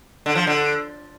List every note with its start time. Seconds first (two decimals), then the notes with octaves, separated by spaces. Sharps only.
0.26 D3
0.35 F3
0.47 D3